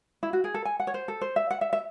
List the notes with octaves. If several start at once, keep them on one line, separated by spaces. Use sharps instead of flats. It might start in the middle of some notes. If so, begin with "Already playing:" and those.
E4
F#4
G#4
A4
G#5
F#5
C#5
C5
A4
C5
E5
F#5
E5
E5